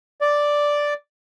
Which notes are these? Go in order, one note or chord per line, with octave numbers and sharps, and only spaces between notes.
D5